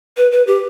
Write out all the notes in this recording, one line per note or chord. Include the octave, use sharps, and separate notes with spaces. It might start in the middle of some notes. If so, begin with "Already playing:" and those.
B4
B4
G4